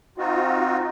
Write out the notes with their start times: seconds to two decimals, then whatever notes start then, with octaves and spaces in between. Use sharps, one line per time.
0.18 C4 D#4 F4 F#4